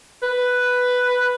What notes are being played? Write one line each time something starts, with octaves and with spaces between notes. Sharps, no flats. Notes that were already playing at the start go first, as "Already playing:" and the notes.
B4